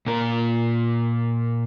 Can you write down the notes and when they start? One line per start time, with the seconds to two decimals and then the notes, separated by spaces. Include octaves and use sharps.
0.06 A#2 A#4